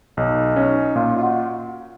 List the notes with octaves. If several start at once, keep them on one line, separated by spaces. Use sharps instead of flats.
B1 D#4
C#4 D#4
A#2 F4
F4
F#4